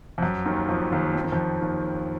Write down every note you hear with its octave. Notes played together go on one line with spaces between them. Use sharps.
F2
F#2
D#2 D#3
F2 F3
D#2 D#3
F3
D#3
F2 F3
D#2 D#3